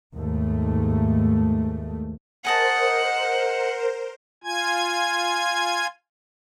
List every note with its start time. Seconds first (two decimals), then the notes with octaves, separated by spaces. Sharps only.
0.14 D#2 G#2 A3
2.45 G#4 A#4 C5 D#5 F#5 A5
4.44 F4 G#5 G#6